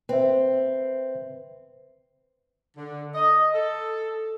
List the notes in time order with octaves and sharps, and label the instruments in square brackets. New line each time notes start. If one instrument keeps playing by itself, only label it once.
[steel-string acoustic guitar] C4 [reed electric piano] B4 E5
[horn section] D3
D#5
A4